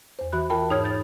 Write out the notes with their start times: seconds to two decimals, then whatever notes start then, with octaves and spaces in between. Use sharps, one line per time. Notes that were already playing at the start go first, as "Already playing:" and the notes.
0.19 E2 C5
0.32 E3 F#4 B5 F#6
0.50 F4 A#4 G5 A5 B5
0.70 G#2 D#4 C#5 D#6 F6 G#6
0.84 G6 A6